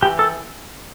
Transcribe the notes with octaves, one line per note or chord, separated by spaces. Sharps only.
E3 G4
A4